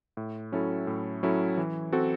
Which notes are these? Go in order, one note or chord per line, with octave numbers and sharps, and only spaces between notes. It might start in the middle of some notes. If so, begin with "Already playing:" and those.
A2
F#3 C#4 E4 A4
A2
F#3 C#4 E4 A4
E3
C4 F#4 A4